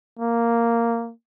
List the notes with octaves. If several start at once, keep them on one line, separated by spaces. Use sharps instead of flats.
A#3